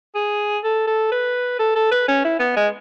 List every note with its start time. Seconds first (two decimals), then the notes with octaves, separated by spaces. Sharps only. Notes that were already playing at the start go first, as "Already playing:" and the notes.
0.15 G#4
0.64 A4
0.87 A4
1.12 B4
1.59 A4
1.76 A4
1.92 B4
2.08 C#4
2.25 E4
2.40 B3
2.56 G#3